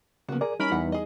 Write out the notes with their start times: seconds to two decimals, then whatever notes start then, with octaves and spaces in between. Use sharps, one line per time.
0.29 C#3 F3 A#3 B3 F#4
0.41 G#4 A#4 D5
0.60 E3 G3 C#4 D#4 A#4 B5
0.72 E2 F#5
0.92 G#4 D#5